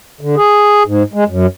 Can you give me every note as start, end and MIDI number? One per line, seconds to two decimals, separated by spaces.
0.21 0.36 50
0.37 0.83 68
0.86 1.03 44
1.13 1.24 56
1.28 1.46 42